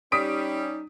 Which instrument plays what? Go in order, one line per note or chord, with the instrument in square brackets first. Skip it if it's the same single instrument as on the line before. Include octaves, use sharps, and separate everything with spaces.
[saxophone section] G3 C#4 [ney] D#4 [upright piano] D#6 B6 D7